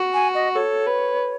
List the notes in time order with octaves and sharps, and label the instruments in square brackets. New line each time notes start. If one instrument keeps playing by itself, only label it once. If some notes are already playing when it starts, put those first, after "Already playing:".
Already playing: [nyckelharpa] F#4
[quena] G#5
D#5
[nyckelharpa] A4 [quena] C#5
[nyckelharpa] B4